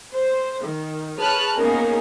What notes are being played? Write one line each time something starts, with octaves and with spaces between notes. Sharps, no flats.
C5
D#3
G#4 B4 C#5 A5 F6 F#6
A#3 B3 C#4 D#4 G#4 A#4